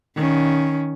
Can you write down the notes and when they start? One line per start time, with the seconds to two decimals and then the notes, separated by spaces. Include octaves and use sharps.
0.16 D#3 C#4